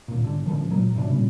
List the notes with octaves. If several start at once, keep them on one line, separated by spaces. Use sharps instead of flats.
D#2 A#2
G#1 D3
A1 G#2 D3 F3
C#2 A#2 F#3
G#2 C3 F#3 D4
A#2 C#3 G3